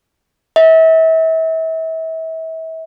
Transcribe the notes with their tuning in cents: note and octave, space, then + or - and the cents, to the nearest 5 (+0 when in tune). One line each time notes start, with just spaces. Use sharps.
E5 -35